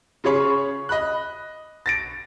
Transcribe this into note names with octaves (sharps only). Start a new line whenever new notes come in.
C#3 F4 G#4 C#5 B5 C#6
D#5 B5 F#6
A6 A#6 D7